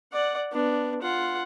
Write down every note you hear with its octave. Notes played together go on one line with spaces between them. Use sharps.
D5 F#5
B3 D4
F4 F#5